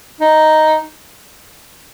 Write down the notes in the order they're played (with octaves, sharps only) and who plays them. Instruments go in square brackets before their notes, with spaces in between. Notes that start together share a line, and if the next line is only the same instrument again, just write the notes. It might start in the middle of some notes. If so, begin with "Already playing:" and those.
[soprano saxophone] D#4